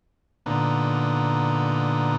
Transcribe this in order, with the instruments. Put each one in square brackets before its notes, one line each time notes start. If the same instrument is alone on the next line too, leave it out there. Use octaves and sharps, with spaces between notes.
[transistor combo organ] A#2 D3 B3 D#4